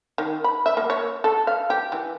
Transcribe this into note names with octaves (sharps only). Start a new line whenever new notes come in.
D#3
B5
E5
A#3
C#5
A4
F5
G4
E3